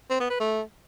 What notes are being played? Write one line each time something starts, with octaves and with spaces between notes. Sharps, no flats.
C4
B3
B4
A3